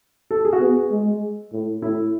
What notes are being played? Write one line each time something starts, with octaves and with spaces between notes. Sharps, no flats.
A4
G#4
F#4
B3 G#4
G#3
A2
A2 E4